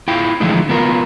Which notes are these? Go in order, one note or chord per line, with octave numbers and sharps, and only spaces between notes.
E4 F4 G5
D3 E3 F3 G#3 A3 D#4
B3 F4 A#4